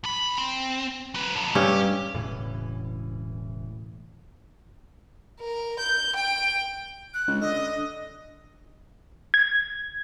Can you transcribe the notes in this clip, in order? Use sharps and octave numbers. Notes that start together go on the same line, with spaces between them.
B1 B5
C4
F#3 B4
B1 F2
G2 C#4 G4
E1 A2 C#3 E3
A#4
G6
G5
F#6
C#2
D3 D#5
G#6